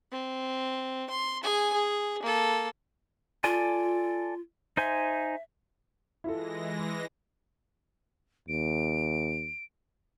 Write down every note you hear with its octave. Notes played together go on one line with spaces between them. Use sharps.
C4
C6
G#4 G#5
G#4
A#3 A4
F4 A4 D5 G#5
D#4 C5 E5 G#5
E3 G#3 E4 F4 A4 A#6
D#2 D7